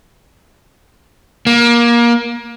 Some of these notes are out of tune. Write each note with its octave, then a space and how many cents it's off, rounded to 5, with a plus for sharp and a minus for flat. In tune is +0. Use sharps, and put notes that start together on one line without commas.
A#3 +25